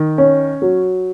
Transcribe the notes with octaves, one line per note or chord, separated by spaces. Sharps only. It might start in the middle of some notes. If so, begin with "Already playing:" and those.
Already playing: D#3
C#4
F#3